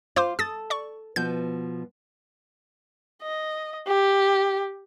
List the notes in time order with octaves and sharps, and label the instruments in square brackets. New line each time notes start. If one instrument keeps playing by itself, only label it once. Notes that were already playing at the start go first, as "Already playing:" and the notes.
[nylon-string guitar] F4 [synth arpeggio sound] C5 C6 D6
[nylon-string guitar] A4 [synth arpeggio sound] D#6 A6
[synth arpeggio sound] D5 C#6
[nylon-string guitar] B2 F3 B3 [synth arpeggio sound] G6
[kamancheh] D#5
G4